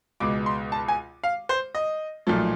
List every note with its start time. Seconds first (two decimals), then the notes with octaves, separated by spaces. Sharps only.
0.20 C#2 B2 G#3 D6
0.46 C6
0.72 A5
0.88 G#5
1.24 F5
1.49 C5
1.75 D#5
2.27 B1 A#2 F3 A3